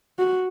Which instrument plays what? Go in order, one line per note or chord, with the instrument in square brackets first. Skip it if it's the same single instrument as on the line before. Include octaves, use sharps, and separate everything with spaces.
[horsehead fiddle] F#4